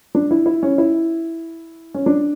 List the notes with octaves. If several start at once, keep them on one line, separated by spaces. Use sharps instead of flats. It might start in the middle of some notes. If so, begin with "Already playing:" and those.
D4
E4
E4
C#4
E4
C#4
D4